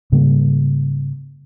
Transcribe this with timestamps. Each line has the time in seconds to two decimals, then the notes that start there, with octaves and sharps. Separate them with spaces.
0.12 G#2 C#3 G3 A#3